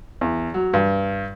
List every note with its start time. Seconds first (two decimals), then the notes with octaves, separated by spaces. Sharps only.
0.21 E2
0.54 F#3
0.74 G2